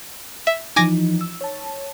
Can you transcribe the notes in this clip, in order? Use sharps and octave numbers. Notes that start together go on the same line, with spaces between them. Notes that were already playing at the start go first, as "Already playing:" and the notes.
E5
E3 F3 D#4 G#5 D6 A#6
E6
C#5 A5